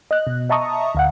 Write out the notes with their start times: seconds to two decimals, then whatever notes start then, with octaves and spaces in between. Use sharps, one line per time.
0.11 D#5 F#6
0.27 B2
0.49 D#5 E5 A5 A#5 C#6 D#6
0.95 D2 F5 F#5